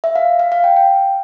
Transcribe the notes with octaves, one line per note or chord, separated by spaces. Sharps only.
E5
F5
F5
F5
G5
G5